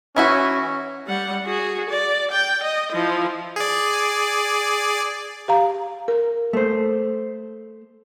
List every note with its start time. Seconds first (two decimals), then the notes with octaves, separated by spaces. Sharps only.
0.16 E3 C#4 E4 F#4
1.07 G3 F#5
1.45 F#4 G#4
1.90 D5
2.32 G5
2.63 D#5
2.92 F3 E4
3.56 G#4 D5
5.48 G4 F5 A#5
6.08 A#4
6.53 A3 C5